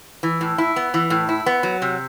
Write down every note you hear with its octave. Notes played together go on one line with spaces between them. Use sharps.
E3
A2
E4
B3
E3
A2
E4
B3
F#3
C3